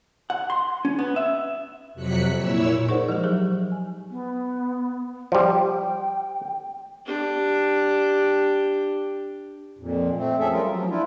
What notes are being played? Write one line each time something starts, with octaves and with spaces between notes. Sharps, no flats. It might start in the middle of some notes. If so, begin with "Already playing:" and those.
F#5
C6
C#4
B3
E5
F2 C3 F#3 F#6 B6 C#7
A#2 E4 C#5 E6
D#4 G#4 A#4 C5 D5 F#5
F3 G#3 G4
F#3 G#4 C5
G#5
B3
F3 G3 G5
D4 G4
F2 A#2
A3 C4
F3 C#4 G#4 A4 E5
G3 A3 C#4 F4 A#4
F3 F#3
D4 E4 F4